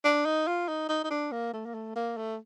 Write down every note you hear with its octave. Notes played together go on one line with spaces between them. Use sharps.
D4
D#4
F4
D#4
D#4
D#4
D4
A#3
A3
A#3
A3
A#3
A3